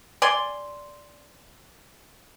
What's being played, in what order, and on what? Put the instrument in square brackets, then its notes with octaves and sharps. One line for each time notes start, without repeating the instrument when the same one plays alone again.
[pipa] D5 G#5 C6